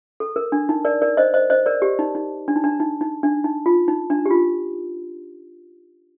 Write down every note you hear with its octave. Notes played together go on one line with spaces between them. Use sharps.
A4
A#4
D4
D#4
A#4 D5
A#4 D5
C5 D#5
C5 D#5
C5 D#5
A#4 D5
G4
D#4
D#4
D4
D#4
D4
D#4
D#4
D4
D#4
F4
D#4
D4
G4
F4